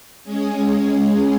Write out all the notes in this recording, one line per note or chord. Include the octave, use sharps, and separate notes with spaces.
G#3 C#4 G#4